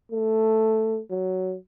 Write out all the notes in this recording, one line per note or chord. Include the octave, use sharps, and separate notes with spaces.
A3
F#3